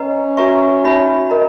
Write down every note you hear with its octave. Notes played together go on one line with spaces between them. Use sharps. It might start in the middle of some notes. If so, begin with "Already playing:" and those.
Already playing: C#4 B4 D#5 F#5 A#5
F#4 B4 E5 A#5 C#6
D#4 F#4 C#5 E5 B5
A#4 D#5 A#5